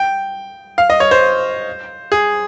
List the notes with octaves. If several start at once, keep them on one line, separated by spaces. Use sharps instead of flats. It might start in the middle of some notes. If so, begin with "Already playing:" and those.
Already playing: G5
F5
D#5
C#5
C5
G#4